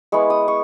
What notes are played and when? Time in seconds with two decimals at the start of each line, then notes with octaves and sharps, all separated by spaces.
0.12 G#3 B3 E4 C#6
0.30 D#6
0.48 C#6